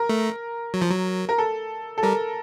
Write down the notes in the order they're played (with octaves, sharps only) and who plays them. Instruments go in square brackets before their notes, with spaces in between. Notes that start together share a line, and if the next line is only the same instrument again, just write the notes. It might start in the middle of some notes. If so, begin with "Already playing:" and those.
Already playing: [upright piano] A#4
[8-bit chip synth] A3
F#3
F3
F#3
[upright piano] A#4
A4
A4
[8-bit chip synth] G3 [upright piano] A#4